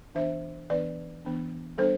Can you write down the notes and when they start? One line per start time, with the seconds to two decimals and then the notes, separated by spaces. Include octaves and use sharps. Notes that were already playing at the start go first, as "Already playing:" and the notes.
0.15 E3 B3 D4 C5 E5
0.70 E3 B3 D4 B4 D5
1.25 E3 B3 D4
1.78 G3 B3 D4 A4 C5